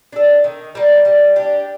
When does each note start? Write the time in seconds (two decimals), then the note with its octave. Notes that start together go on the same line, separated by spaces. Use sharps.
0.12 D4 A4
0.44 D#3
0.75 G3 A#3
1.05 G3
1.36 D4 G4